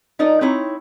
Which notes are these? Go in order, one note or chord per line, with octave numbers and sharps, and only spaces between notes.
F3 D#4 A#4 D5 D#5
C4 D#4 E4 C#5